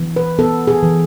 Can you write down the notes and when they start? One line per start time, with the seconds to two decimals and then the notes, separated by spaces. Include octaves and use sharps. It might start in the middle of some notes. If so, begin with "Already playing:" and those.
Already playing: E3 B3
0.16 B4
0.39 B3 A4
0.67 G#4
0.83 E3